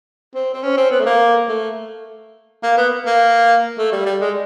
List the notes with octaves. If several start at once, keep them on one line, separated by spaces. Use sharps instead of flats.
C4
C4
C#4
C4
B3
A3
A#3
A3
A#3
B3
A#3
A3
G3
G3
G#3